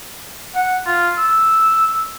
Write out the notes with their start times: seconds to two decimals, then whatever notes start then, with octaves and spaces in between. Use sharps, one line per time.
0.55 F#5
0.86 F4
1.18 E6